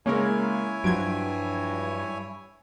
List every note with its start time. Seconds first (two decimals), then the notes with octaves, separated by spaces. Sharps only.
0.06 C#3 G#3 A#3 C#4 E4 A#4 C#5 G#5
0.84 G2 F3 F#3 G#6 D7